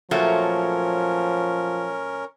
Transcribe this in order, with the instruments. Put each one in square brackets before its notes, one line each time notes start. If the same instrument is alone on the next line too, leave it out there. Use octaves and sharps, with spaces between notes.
[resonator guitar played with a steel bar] A#2 F#3 A3 [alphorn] F3 [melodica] C#4 A#4